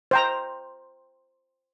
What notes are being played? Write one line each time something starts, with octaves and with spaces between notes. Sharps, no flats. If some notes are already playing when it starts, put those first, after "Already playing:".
C5 G5 A#5